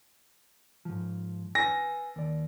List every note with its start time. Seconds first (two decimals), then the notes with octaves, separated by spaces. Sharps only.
0.85 G#2 F3
1.55 B4 G#5 A#6
2.16 D#2 D5